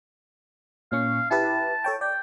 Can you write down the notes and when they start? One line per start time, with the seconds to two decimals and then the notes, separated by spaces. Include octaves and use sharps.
0.92 A#2 C#4 F5 C#6
1.31 E4 G4 B4 A5
1.84 A4 C#5 G5
2.01 D5 G5